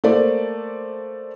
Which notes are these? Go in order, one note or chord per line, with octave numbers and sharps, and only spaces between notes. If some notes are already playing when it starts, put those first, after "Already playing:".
A3 A#3 C5 D5